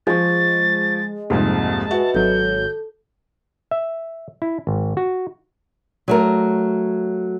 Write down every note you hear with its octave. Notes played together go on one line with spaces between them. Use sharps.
F3 G#3 C5 C#6 A6
C2 F2 G#2 A#3 A5
F#4 B4 D#5 E5
G#1 F#3 A4 G6
E5
E4
G#1
F#4
F#3 A3 A#4